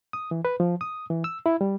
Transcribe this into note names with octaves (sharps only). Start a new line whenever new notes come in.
D#6
E3
B4
F3
D#6
E3
E6
E4
G3